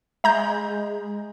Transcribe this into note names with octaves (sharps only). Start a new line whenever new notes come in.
G#3 E5 A#5 G6